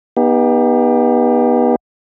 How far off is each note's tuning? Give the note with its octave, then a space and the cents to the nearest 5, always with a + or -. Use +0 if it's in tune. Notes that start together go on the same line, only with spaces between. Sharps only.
B3 -25 D#4 +0 G4 +25